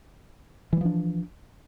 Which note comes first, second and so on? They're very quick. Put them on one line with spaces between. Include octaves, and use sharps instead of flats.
E3 G3 F3 D4